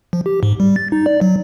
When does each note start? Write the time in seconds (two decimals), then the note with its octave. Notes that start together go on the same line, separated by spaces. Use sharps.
0.13 F3
0.26 G4
0.43 G#2
0.60 G3
0.76 A6
0.92 D#4
1.06 D5
1.21 F#3